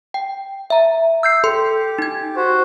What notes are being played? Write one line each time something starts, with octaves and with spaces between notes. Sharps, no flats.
G5
E5 A#5
E6 G6 C7
G4 A4 C6
D#4 G#6
F#4 C5